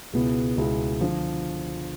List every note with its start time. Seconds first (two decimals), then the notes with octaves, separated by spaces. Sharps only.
0.13 C#2 B2 G#3 B3 E4
0.57 C#2 B2 G#3 B3 E4
1.01 D3 F3